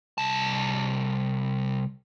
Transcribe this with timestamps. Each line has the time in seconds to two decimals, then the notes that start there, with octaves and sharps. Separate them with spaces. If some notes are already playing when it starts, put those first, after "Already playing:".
0.18 C2 A5